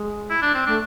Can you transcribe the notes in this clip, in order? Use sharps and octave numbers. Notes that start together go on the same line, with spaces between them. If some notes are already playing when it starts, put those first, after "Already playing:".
Already playing: G#3
E4
D4
C4
A3 D4